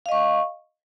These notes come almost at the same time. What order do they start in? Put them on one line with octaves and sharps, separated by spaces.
F5 D#5 C#6